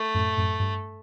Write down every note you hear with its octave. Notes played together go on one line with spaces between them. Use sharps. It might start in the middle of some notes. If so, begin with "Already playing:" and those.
Already playing: A3
F#2 A2
F#2 A2
G2